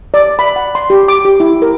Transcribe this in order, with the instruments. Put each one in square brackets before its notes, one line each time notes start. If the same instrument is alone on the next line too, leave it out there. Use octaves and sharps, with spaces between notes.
[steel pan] D5
B5
F#5
C6
G4
D6
G4
E4
A#4